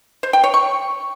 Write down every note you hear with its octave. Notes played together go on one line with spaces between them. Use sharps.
C5
G5
C#5
C#6